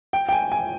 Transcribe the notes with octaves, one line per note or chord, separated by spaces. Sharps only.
G5
G5
G#5
G#5